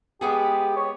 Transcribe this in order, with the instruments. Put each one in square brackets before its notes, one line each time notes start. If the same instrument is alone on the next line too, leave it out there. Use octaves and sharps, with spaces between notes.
[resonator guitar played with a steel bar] G#3 B3 G#4 [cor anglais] G4
[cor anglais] C#5